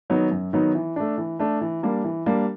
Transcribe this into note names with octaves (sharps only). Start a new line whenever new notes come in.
D#3 F#3 B3 D#4
F#2
D#3 F#3 B3 D#4
E3
A3 D4
E3
A3 D4
E3
G3 A#3 D4
E3
G3 A#3 D4